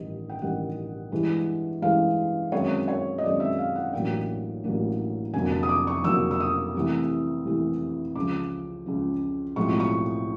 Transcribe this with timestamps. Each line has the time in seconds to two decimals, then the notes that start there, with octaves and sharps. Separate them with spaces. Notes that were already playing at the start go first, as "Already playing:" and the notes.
Already playing: A1 G2 D#3 D#5
0.30 G5
0.41 A1 G2 D#3 F#5
1.12 G2 E3 G#3
1.82 G2 E3 G#3 F5
2.52 F#2 D#3 G#3 C4 C#5
2.88 C#5
3.18 D#5
3.23 F#2 D#3 G#3 C4 D5
3.40 E5
3.59 F5
3.75 F#5
3.93 A1 A2 F#3 A#3 D4 G5
4.64 A1 A2 F#3 A#3 D4
5.34 F1 F2 D3 F#3 A#3 G#5
5.51 A5
5.63 D#6
5.69 D6
5.87 C#6
6.04 F1 F2 D3 F#3 A#3 E6
6.31 E6
6.40 D#6
6.75 C2 C3 E3 A3
7.45 C2 C3 E3 A3
8.15 C#2 C#3 F3 D6
8.86 C#2 C#3 F3
9.56 B1 A2 F3 G#3 C4 C#6
9.80 C#6